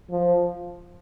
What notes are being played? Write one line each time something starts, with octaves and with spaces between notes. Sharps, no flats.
F3